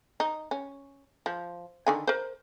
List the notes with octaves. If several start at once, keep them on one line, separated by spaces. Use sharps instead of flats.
D#4
C#4
F3
D3 D#3 G#5
A#4 C5